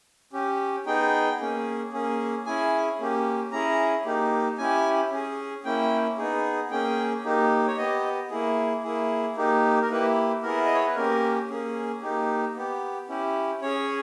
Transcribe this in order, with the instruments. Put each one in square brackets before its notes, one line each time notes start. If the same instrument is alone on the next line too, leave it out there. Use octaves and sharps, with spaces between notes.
[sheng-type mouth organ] C#4 G4
B3 D#4 G#4 G5
A#3 C#4 G#4
A#3 C#4 G#4
C#4 E4 G#4 G#5
A#3 C#4 G4
C#4 E4 G#4 A#5
A#3 D#4 G4
C#4 E4 G4 G#5
C#4 G#4
A#3 C#4 E4 G5
B3 D#4 G#4
A#3 C#4 G#4 G5
A#3 D#4 G4
C#5
B3 G4 D#5
A#3 E4 G#4
A#3 E4 G#4
A#3 D#4 G4
A#4
A#3 E4 G4 B4
B3 E4 G#4 A#4
D#5
C#5
B4
A#3 C#4 G4 A#4
A#3 C#4 G#4
A#3 D#4 G4
B3 G4
C#4 E4 G4
C#4 G#4 C#5